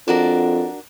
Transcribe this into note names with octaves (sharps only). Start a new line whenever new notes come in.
F2 D4 F#4 A#4